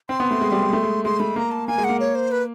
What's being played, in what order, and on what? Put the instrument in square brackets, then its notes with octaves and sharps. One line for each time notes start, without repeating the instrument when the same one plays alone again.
[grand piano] C4 [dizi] C6
[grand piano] B3
A3
G#3
G3
G#3
A3
G#3
[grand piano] G#3 [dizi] C6
[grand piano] A3 [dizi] B5
[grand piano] A#3 [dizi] A#5
[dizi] A5
[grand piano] A#3 [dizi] G#5
[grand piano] G#3
[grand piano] A#3 [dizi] F#5
[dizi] C#5
C5
B4